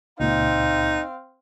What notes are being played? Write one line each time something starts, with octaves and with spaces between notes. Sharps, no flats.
C#2 A#2 C4 D#4 F5